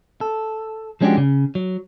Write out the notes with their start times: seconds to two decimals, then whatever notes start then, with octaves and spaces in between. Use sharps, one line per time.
0.21 A4
1.01 F3 G#3 C#4 D4 F#4 G4
1.18 C#3
1.55 F#3